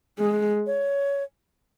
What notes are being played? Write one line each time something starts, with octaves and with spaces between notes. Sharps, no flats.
G#3 G#4
C#5